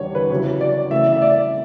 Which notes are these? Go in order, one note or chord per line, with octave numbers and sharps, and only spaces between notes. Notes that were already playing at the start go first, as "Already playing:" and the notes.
Already playing: E2 D3 G3 C#5
B4
C#3 F#3 C#4 E4 C#5
D5
C#3 E3 A3 E5
E5
D5